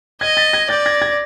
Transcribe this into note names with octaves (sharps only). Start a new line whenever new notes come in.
D#5 G#6 A#6
A6 B6
G#6 A#6
D5 G6 A6
G#6 A#6
G#6 A#6